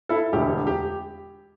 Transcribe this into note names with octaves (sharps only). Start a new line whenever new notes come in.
E4 A4
E1 D2 D3 G4
G4